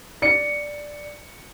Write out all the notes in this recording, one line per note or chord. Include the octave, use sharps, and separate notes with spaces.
D5 C#7